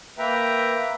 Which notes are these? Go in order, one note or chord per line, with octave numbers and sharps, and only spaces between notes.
A#3 B4 E5 G5 A#5